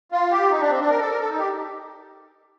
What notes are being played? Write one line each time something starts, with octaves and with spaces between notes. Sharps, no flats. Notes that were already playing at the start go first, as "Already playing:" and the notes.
F4
G4
D#4
D4
C4
D4
A#4
A4
A#4
A4
D#4
G4